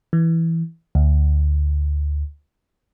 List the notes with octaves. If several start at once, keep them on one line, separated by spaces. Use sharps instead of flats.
E3
D2